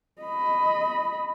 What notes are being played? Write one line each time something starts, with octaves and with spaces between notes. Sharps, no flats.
D#5 B5